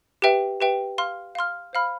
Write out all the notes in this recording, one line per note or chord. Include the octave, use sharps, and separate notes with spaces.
G4 B4 E5 G5
G4 B4 E5 G5
F5 C6 F6
F5 C6 F6
C5 F5 B5 F6